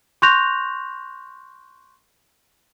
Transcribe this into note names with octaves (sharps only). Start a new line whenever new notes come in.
C6 C#6 F#6 G6 A#6 F7